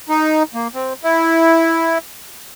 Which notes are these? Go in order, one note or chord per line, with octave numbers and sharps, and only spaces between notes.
D#4
A#3
C4
E4